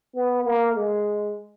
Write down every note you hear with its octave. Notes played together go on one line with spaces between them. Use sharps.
B3
A#3
G#3